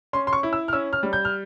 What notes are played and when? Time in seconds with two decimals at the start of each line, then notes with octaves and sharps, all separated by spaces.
0.13 C#4 C6
0.27 C6
0.33 C#6
0.43 E4
0.53 E6
0.68 F6
0.73 C#4 E6
0.93 F6
1.03 G3
1.13 G6
1.25 F6